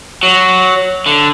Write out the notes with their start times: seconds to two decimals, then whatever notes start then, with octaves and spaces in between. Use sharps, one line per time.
0.23 F#3
1.06 D3